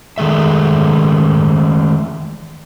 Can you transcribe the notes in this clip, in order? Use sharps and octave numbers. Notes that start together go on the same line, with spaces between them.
D#3 G#3 A3 E5